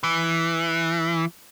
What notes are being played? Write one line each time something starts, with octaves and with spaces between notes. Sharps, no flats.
E3